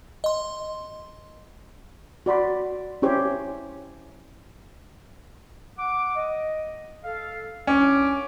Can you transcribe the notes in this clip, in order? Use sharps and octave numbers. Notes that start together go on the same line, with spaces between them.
D#5 C6
F#4 D5 B5 C6
C#4 E4 G4 C5 C#5
F#5 D6
D#5
A4 F5
C2 C#4 D4 D6